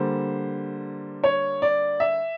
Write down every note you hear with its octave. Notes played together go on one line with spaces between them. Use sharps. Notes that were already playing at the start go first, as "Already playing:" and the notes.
Already playing: D3 G3 A#3 C5
C#5
D5
E5